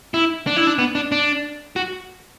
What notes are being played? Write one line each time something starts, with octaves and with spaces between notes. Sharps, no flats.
E4
D4
E4
D4
B3
D4
D4
F#4